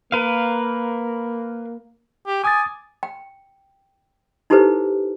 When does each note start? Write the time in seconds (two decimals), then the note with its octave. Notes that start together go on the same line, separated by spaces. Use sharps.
0.12 A#3 A#4 B4 F5
2.27 G4
2.44 G#5 D6 D#6 A6
3.03 G5
4.50 D#4 E4 G4 A4 B4 C5